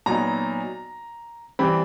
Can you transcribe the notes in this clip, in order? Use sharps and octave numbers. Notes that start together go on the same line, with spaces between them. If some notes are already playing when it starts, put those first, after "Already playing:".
A#2 F#3 B3 D#4 A#5
C3 E3 G3 C4 B5